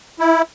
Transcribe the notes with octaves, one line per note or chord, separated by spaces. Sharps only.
E4